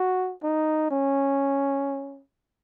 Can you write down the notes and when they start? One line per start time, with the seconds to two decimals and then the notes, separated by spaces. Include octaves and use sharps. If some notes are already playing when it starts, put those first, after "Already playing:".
Already playing: F#4
0.43 D#4
0.91 C#4